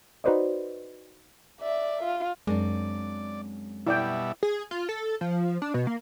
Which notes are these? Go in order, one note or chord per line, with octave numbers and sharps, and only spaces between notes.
D#4 F#4 B4 C5 D5 D#5
D5 E5
F4
F#2 G#3 C4 D4 D5
B2 G3 E4 D5 E5 G5
G#4
F4
A4
F3
D4
B2
A#3